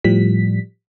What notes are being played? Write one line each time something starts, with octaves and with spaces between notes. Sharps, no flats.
A2 F3 G3 B6